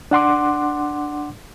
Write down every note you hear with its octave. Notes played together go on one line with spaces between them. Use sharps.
D4 F#5 C6 D6